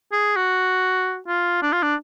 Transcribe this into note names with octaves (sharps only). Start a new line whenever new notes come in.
G#4
F#4
F4
D4
F4
D4